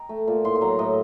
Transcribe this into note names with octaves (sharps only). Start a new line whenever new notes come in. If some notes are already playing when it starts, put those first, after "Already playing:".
Already playing: D#5 G5 A#5
A3
A#2
A2 C6
C6
F#3 A#5
A2 D#5